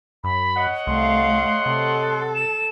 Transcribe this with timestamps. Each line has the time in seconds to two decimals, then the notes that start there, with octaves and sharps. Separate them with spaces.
0.24 F#2 B5
0.57 C#5 D#5 F#5
0.87 C2 A3 F5 C6
1.66 C3 A4
2.35 E7